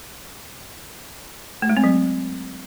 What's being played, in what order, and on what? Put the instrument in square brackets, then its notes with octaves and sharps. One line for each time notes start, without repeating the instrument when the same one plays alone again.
[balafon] A3
G#3
C4
F#3